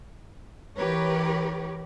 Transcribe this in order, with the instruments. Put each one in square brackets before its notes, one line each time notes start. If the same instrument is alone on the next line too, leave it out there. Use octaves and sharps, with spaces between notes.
[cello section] E3 G4 A#4 B4 C#5